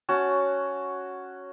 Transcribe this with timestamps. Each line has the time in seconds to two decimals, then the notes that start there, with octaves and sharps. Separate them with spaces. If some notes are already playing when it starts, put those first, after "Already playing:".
0.09 C#4 F#4 A5